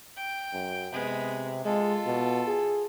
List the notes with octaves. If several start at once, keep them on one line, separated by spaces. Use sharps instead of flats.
G5
F#2
C3 G#3 B3
G#3 F4 A4
B2
G#4